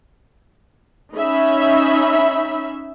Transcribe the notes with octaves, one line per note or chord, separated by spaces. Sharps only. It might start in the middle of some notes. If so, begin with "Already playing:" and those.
C#4 D#4 E5 B5